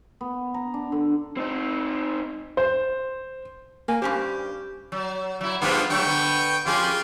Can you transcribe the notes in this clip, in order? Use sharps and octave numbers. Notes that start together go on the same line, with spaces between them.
B3
A#5
D4
D3
C4 D#4
C5
A#3 G#5
G2 C#4 G4 C5
F#3
F#3 E4
G2 F3 G3 B3 F4 G4
G2 F#3 A3 G5 C#6
D3 B3
F2 F4 G4 G#4